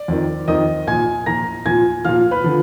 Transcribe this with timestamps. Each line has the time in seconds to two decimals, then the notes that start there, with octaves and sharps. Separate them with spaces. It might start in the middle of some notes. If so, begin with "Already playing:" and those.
Already playing: D5
0.08 F2 D#3
0.48 F2 D#3 D#5 D#6
0.87 A#2 F3 G#5 G#6
1.26 A#2 F3 A#5 A#6
1.66 A#2 F3 G#5 G#6
2.05 A#2 F3 F5 F6
2.31 B4 B5
2.44 D3 F3